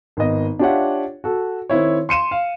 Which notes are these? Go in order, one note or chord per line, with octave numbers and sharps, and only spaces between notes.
G#1 B3 D#5
D4 F4 G4 C#5 E5 F#5
F#4 A4
D#3 C4 E4 C#5
C6 C#7 D#7 E7
F5